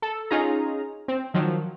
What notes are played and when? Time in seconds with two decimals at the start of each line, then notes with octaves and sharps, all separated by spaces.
0.02 A4
0.31 C#4 D#4 F4 G#4 A#5
1.08 C4
1.34 D#3 F3 F#3